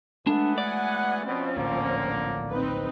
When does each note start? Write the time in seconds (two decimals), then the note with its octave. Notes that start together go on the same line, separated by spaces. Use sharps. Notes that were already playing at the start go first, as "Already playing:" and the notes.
0.27 E3 F#3 G#3 A3 B3 D4 A4
0.58 D5 F#5 G#5
1.26 B2 F3 C4 C#4
1.56 D1 A#1 D3 A#3
2.49 C4 D#4 B4